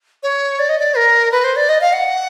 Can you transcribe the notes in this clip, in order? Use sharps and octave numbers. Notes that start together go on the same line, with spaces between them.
C#5
D5
D#5
D5
A#4
B4
C5
D5
D#5
F5
F#5